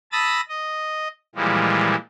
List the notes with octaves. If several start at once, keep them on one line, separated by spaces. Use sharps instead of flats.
A5 B5 D#6 E6 A6 A#6
D#5
A#2 E3 F3 G3 G#3